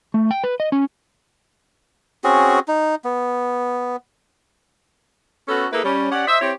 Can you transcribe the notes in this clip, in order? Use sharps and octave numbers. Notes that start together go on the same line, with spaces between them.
A3
G5
B4
D#5
C#4
C4 C#4 F#4 G#4
D#4
B3
B3 C#4 F#4 A4
A#3 E4 G#4 A4 B4
G3 C#4
C#4 G4 D5 F#5
C5 D#5 E5
C4 E4 G4 C#5